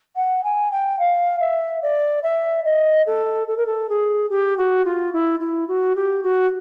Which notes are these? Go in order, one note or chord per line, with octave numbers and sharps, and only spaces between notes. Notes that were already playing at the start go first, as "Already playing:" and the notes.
F#5
G#5
G5
F5
E5
D5
E5
D#5
A4
A4
A#4
A4
G#4
G4
F#4
F4
E4
E4
F#4
G4
F#4